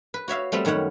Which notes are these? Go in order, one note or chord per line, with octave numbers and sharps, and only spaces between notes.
B4
F#4 C#5 E5 F5
G3 A3 B3 C4
F#2 D#3 G3 C#5 F#5